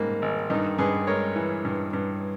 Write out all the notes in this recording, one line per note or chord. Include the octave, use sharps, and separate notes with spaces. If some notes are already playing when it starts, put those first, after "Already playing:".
Already playing: G#2 G3 A#3
G#1
G2 D#4
G2 G#4 B4
G#3 A#4 C#5
E3
G2
G2